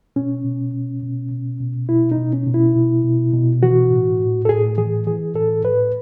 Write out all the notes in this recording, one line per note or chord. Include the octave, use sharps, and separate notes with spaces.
B2 C#4
B2
B2
B2
B2
B2
B2 E4
D#4
B2
C#4
B2
E4
B2
B2
B2
E3 F#4
A2
A2
A4
A2 G#4
E3 G#4
E3 G#4
A2 A4
A2 B4